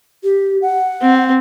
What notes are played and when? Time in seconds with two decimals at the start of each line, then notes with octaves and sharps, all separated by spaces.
0.24 G4
0.62 F#5
1.02 C4